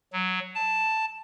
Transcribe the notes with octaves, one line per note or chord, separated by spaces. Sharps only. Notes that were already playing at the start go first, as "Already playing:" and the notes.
F#3
A5